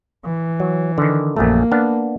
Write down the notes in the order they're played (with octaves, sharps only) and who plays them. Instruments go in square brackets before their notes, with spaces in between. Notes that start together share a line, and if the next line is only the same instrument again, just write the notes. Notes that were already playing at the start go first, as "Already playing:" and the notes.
[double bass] E3
[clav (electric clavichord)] F#3
D3 D#3
[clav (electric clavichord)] A#1 F#2 A3 [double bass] A#3
[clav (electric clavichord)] B3 D4 F5